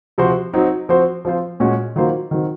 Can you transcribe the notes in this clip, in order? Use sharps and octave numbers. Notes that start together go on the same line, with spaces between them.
C3 F3 C4 F#4 C5
F#3 C4 D#4
F3 C4 F#4 C5
F3 C4 F4 C5
A#2 G#3 C#4 F#4
D#3 F#3 A#3 F4 C5
D#3 F#3 C4